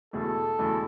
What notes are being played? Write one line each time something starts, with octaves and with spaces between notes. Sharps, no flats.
E2 B2 A3 E4 G#4 A4
E2 B2 A3 E4 G#4